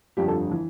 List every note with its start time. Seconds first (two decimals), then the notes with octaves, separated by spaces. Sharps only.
0.17 G1 F2 D3 G3 G4
0.28 A4
0.51 E3